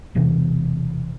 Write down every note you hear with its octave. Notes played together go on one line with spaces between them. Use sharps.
E1 E2 C3 E3